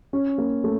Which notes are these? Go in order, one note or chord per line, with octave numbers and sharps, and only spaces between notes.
C#4
A#3
A3